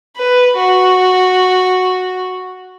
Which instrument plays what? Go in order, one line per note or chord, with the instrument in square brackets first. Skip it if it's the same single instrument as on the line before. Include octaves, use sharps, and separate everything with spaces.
[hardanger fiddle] B4
F#4